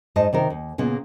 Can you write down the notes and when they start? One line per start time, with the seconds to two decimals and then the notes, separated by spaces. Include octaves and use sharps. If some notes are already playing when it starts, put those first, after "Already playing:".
0.16 G#2 D#4 D#5 A5
0.33 C3 D#3 A#4
0.50 D#2
0.78 A#2 C#3 A#3 B3